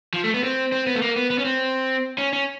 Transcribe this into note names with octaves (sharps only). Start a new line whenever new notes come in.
F3
A3
B3
C4
C4
B3
A3
A#3
B3
B3
C#4
C4
C#4
C#4